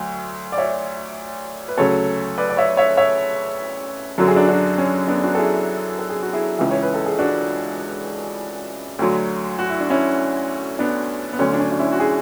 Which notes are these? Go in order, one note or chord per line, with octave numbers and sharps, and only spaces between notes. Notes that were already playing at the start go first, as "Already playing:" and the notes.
Already playing: D2 F#3
D5
C#5 E5
B4
D2 C#3 F#3 A4 C#5
B4 D5
D5
C#5 E5
C#5 E5
C#5 E5
F#2 D3 F#3 F#4
G#4
D4 F#4
D4 F#4
C#4
B3 D4
D4 F#4
A4
E4 G#4
A4
G#4
F#4
E4 G#4
C#2 C#3 E3
C#5
B4
A4
G#4
D4 F#4
D2 D3 F#3
F#4
E4
D4
C#4 E4
B3 D4
B3
D2 D3 F#3 C#4
D4
C#4
D4
C#4 E4
F#4
E4 G#4